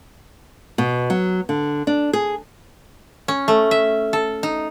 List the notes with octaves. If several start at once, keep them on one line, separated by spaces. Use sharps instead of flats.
B2
F#3
D3
D4
G#4
C#4
A3
E5
A4
D#4